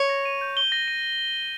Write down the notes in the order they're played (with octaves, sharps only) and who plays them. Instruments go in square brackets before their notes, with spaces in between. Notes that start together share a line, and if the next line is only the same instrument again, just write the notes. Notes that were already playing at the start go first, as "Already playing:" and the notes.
Already playing: [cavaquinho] C#5
[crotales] A#6
D#7
G6
G7
A#6
D#7